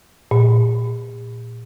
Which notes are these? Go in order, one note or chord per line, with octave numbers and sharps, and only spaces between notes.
A#2